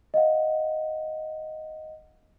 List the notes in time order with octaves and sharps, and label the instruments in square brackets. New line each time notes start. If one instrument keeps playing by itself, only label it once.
[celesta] D#5 F5 F#5